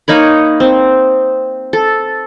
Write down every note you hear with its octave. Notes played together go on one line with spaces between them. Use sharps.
A#3 D#4 C#5 B5
C4
A4